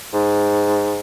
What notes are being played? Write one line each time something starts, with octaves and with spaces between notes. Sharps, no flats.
G#2